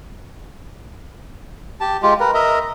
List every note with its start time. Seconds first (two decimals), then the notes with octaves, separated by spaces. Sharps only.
1.81 G4 A5
2.03 G#3 F4 G4
2.20 A#4 B4
2.34 A#4 D#5 E5